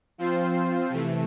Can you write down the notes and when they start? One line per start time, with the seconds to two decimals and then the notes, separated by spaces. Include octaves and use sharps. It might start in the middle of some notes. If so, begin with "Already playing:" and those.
0.18 F3 C4 F4 C5
0.89 C3 E3 A3